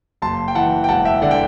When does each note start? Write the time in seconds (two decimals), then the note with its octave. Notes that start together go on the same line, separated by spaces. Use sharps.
0.22 F#1 A5 C6
0.48 G5
0.55 E3 F#5 A5
0.84 G5
0.89 E1 F#5 A5
1.05 E5 G5
1.22 D3 D5 F#5
1.31 G5